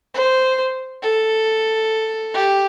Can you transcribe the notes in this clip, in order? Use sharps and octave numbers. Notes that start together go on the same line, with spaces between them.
C5
A4
G4